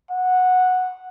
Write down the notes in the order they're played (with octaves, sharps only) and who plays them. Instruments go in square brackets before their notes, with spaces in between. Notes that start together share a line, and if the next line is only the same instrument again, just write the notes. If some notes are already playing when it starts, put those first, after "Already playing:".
[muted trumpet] F#5